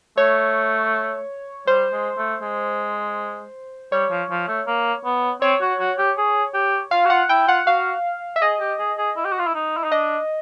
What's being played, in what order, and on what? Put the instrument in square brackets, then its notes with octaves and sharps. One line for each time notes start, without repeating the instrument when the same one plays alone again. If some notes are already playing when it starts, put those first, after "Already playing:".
[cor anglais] A3 [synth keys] C#5
[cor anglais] G3 [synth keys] C5
[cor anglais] G#3
A3
G#3
[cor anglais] G3 [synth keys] C#5
[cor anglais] F3
F3
A3
A#3
B3
[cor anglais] C4 [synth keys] C#5
[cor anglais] F#4
F#4
G4
G#4
G4
[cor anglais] F4 [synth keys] F5
[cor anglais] F#4
[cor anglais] F4 [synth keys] F#5
[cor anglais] E4 [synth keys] G5
[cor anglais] F4 [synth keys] F#5
[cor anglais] F#4 [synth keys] F5
[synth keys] E5
[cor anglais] G#4 [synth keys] D#5
[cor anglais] G4
G#4
G#4
E4
G4
F#4
F4
E4
D#4
E4
D#4
[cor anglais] D4 [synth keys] D#5